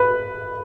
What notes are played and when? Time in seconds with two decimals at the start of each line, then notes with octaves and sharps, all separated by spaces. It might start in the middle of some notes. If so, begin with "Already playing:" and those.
Already playing: B4 B5